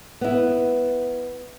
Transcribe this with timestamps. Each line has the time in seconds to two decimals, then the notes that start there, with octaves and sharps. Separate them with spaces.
0.21 B3 E4